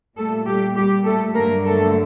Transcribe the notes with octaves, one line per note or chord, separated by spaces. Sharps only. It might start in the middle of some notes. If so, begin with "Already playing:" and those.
A#2 G3 A3 A#3 A4
G3 G4
G3 G4
A3 A4
G2 D3 F#3 A3 A#3 A#4
A3 A4